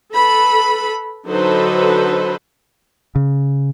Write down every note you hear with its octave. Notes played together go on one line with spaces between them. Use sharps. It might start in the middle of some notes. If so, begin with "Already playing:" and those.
A4 B4 B5
D3 F#3 D#4 A4 B4 C5
C#3